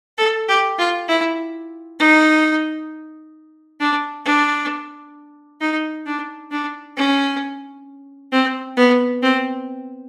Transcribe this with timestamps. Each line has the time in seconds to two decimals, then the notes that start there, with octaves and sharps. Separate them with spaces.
0.18 A4
0.48 G4
0.79 F4
1.08 E4
1.99 D#4
3.80 D4
4.25 D4
5.61 D#4
6.06 D4
6.51 D4
6.97 C#4
8.32 C4
8.77 B3
9.23 C4